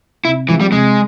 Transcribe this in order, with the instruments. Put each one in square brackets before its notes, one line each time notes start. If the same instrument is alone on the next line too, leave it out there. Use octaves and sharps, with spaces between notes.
[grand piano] C3 [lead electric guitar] E4
[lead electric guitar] E3 [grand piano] F3 G#3 C4 F4
[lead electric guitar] G3
[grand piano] C3 [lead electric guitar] G#3